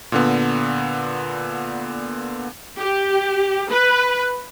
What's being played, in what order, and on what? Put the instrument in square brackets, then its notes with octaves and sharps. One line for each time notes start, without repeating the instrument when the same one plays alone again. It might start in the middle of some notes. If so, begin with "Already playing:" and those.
[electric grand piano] A#2 D3 B3
[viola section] G4
B4